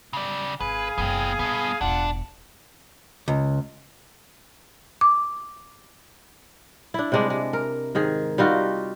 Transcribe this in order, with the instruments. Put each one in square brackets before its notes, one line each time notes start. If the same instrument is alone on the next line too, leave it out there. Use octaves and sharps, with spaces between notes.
[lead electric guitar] C#3 D5
[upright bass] G#1 [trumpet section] G#4 F5 G#5 [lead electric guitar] B4
[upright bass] F#1 C3 [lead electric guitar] B3 G5
[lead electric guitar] G2 B3 [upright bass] A#2
[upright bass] E1 A1 [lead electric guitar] D4 [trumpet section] F4 F#5
[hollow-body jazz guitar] C#2
[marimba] D6
[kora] D4 E4
C3 G3 G#3 D4
G#3
A#4
G#2 D#3 G#4
G3 D#4 F4 F#4